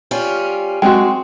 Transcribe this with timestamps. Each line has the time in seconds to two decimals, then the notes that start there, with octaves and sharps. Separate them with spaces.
0.11 G3 C#4 F4
0.82 G#3 C4 F#4 G5